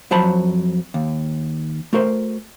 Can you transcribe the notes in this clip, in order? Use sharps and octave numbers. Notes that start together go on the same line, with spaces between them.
F2 F#3 C5 A5 B5
D#2
A3 F#4 A#4 C5